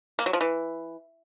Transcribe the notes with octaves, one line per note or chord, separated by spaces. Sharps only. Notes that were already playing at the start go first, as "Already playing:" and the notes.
A#3
F#3
F3
E3